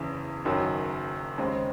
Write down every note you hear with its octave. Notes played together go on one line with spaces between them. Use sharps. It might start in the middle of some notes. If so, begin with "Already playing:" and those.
Already playing: F#1 E2 C#3 E3
F#1 F#2 D#3 F#3
D#2 C#3 G#3 C4